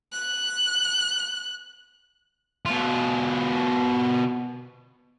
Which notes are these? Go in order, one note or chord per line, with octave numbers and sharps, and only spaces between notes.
F#6
B2 F4